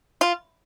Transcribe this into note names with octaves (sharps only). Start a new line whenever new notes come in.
F4